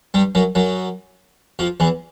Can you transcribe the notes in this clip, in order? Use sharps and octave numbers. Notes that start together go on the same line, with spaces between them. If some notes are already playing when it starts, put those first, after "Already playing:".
G2 G3
F#2 F#3
F#2 F#3
F2 F3
E2 E3